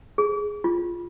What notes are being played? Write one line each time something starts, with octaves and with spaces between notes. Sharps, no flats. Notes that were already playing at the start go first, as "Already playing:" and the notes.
G#4
F4